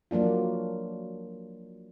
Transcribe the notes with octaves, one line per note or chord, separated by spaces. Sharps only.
F3 F#3 A#3 D4 F4